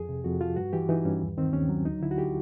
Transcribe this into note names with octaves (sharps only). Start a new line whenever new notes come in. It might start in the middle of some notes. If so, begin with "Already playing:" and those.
Already playing: F2 G#4
C3
F2 F#4
F3 F4
G2 F#4
E3 G4
E3 D#4
G2 C#4
D#2
D#3 C4
D#2 C#4
F#3
D2 D#4
D3 E4
F#4
G4